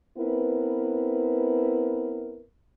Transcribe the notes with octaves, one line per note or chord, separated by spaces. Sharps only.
B3 C4 E4 A#4 B4